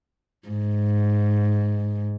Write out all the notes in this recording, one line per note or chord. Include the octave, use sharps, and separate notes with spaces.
G#2